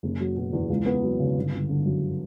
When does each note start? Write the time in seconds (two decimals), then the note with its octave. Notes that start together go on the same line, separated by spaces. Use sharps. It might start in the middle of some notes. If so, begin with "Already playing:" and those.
0.03 F#1
0.21 F#3
0.36 B2
0.53 E2
0.69 C#2
0.86 B3
1.03 F#3
1.19 C#3
1.37 G1
1.53 G1
1.69 D3
1.85 F#2